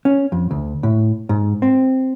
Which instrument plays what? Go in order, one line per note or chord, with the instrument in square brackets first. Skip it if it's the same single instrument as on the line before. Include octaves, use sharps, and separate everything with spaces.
[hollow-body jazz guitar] C#4
F2
D2
A2
G#2
C4